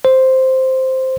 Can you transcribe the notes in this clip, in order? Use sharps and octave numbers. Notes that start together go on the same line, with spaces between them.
C5